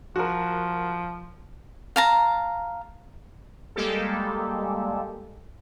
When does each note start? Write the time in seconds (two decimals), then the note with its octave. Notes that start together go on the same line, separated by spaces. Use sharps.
0.16 F3 F#4 A#4
1.96 F5 A5 A#5
3.76 G3 G#3 A#3 G4 A4